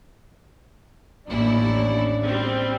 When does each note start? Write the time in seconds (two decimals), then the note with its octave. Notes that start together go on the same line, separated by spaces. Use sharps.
1.27 A1 D#2 C#4 D4 E4 D5
2.26 G3 C4